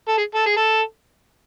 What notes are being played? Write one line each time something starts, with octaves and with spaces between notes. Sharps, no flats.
A4
G#4
A4
G#4
A4